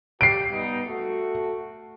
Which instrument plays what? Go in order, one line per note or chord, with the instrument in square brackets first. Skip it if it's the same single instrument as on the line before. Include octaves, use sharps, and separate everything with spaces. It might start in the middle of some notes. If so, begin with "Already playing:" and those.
[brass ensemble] G4 [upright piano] C7 D7
[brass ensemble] G3 B3 D#4
A3 F#4